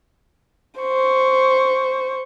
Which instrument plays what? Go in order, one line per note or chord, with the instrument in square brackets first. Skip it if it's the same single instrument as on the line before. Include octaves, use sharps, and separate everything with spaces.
[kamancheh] C5 C#6